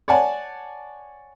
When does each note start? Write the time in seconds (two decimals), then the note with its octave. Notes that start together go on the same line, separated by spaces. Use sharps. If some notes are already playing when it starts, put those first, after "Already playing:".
0.08 C#5 D5 F#5 G#5 A5